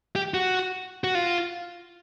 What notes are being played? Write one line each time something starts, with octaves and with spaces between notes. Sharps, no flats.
G4
F#4
F#4
F4